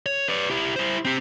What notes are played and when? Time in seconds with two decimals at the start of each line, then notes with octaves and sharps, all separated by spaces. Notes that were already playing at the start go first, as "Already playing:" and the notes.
0.06 C#5
0.29 B4 D5
0.50 E4 G4
0.76 E4 C5
1.05 C4 G4